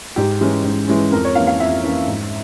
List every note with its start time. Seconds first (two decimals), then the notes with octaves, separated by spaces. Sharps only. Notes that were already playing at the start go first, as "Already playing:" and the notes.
0.16 G#2 G4
0.41 E3 G#3 C#4
0.64 G#2
0.88 E3 G#3 C#4
1.12 F2 A#4
1.25 C#5
1.35 E3 A#3 C#4 F5
1.47 F5
1.60 F2 E5
1.83 E3 A#3 C#4
2.08 G#2